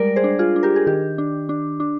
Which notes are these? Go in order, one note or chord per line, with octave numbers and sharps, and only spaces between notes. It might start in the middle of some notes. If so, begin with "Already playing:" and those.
Already playing: G3 G#3 A#4 D5
G#4 C5
D4
F4 G#4
D4
G4 A#4
G#4
D#3 G4
D4
D4
D4